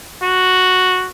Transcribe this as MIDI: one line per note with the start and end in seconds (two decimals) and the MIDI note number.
0.22 1.09 66